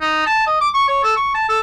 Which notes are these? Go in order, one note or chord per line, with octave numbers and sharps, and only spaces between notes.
D#4
A5
D#5
D6
C#6
C#5
A4
C#6
A5
A4